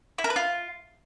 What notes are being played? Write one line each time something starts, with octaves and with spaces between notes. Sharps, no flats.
E4
A#4
B4
F4